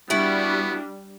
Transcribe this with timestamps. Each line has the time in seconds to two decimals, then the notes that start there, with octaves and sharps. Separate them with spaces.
0.10 G3 B3 D4 E4 F#4